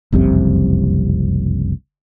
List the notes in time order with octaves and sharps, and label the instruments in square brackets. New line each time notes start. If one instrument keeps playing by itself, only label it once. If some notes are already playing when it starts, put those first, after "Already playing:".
[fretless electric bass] F#1 C2 F2 C3